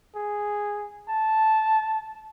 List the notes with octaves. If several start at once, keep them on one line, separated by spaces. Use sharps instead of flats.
G#4
A5